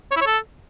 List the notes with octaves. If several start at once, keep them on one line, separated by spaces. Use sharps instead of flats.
C#5
E4
C#5
A4